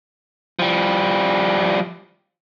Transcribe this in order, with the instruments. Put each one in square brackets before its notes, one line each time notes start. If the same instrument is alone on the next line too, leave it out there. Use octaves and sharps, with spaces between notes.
[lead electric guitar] F3 G3